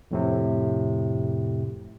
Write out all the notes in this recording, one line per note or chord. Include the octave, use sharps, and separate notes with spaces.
F2 A2 C3